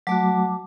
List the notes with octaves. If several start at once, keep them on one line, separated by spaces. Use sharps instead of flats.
F#3 A3 F#4 A5 D6